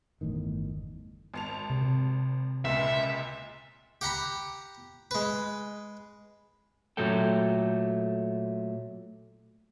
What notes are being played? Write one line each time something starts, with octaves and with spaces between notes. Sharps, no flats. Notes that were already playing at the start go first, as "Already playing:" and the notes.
G1 E2 A2 D#3
G#1 A5 F7
C3
C#2 A#2 E5
G4 F#5 A#5 B5
G#3 B4
A#2 F#3 A3 A4 G5